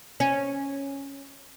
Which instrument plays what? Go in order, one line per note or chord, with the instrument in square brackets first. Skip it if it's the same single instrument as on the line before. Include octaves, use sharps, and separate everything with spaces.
[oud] C#4